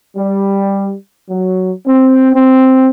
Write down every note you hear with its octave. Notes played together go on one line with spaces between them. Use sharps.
G3
F#3
C4
C4